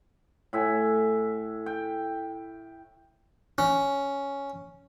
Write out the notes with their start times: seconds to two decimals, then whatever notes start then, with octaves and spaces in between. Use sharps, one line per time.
0.53 A2 E5 G#5
1.66 G5
3.58 C#4